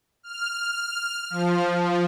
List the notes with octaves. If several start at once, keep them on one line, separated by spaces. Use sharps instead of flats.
F6
F3